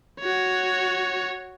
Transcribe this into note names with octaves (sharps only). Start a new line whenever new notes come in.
F#4 C#5